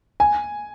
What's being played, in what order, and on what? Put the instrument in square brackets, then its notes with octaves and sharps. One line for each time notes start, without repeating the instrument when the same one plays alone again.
[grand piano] G#5